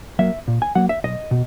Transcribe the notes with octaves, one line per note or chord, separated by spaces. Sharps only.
F#3 A#3 E5
A#2
G#5
F#3 A#3 F#5
E5
B1 D#5
B2